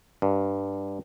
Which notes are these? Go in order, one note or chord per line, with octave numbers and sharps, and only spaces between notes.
G2